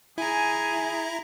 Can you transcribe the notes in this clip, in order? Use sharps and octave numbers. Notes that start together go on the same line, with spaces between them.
E4 G#4 G#5 A#5